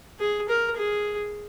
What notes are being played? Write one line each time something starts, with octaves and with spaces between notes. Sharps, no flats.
G#4
A#4
G#4